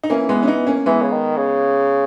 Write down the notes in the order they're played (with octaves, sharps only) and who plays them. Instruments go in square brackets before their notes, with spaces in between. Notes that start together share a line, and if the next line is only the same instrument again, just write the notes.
[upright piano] D#4
[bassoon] E3 [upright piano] A#3 C#4
[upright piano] G#3 B3
C#4
B3 D#4
A#3 C#4
[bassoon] E3 [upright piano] G#3 B3
[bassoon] C#3
D#3
C#3